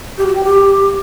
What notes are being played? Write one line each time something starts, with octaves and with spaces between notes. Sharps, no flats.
G4
F#4
G5
G4